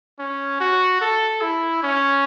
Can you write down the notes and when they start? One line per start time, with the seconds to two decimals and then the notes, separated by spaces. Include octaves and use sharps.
0.19 C#4
0.60 F#4
1.01 A4
1.42 E4
1.83 C#4